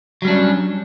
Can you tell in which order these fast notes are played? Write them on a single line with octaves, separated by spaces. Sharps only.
F#3 G3 D4 C#4